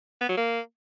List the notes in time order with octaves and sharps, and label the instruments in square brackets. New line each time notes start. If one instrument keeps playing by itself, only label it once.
[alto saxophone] B3
F#3
A#3